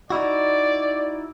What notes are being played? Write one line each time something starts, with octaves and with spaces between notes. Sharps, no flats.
D#4 E4 F#4 D5